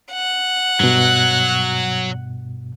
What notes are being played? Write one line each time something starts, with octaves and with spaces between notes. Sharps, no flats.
F#5
G2 B2 F#3